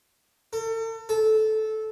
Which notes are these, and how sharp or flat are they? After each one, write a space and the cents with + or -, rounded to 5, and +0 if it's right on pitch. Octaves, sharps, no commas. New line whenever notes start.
A4 +40
A4 -15